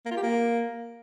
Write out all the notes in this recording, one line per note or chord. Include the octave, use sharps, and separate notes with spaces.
A#3
F4
G4
A#3